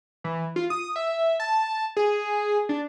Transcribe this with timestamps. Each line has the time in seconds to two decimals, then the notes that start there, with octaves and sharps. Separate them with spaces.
0.24 E3
0.56 F4
0.70 D#6
0.96 E5
1.40 A5
1.97 G#4
2.69 D4